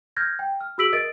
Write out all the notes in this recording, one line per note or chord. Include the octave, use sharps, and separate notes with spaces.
F6 G6 G#6 A#6
G5
F6
F#4 G#4 E6 B6 D7 F#7
A#4 D#5 D#6 A6 D7